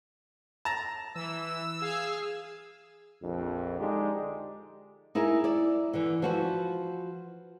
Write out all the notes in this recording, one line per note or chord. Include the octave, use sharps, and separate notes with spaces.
A5 A#5
E3 E6
G#4 F5
A#1 F2
D3 G#3 D4 D#4 G4
D#4 E4 G#4 A#4
E4 D5
D3 E3
F3 F#4 B4